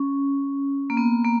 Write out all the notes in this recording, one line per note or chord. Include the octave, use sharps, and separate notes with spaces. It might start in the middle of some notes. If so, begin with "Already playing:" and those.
Already playing: C#4
A#3
B3
A#3